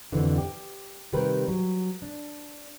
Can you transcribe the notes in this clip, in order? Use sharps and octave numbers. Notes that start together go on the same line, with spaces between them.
F2 B2 D3 E3
G4
C3 D#3 G3 G4 A#4 B4
F#3
D4